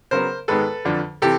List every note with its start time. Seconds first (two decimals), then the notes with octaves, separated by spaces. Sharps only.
0.11 C#3 F#3 B3 A#4 C5
0.48 G#2 D#3 G#3 B3 A4 B4
0.85 F2 D3 F3
1.22 C3 E3 G4 A4